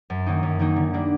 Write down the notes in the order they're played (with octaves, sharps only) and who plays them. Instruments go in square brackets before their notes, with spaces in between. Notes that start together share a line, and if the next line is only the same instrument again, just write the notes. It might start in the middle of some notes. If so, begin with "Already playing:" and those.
[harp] F#2
D#3 F#3 A#3 D#4
F#2
D#3 F#3 A#3 D#4
D3
G3 A#3 D4